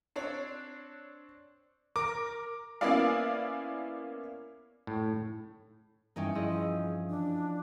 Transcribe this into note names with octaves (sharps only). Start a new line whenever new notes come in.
C4 D4 C#5
A#4 D6
A#3 B3 C#4 E4 D5 F5
A2
G2 E3 C#4 D#4 G5
F3 E4 G#4 D#5
D4